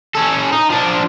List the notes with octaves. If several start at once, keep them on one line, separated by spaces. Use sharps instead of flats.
C#4 A4
D#4
F3 D4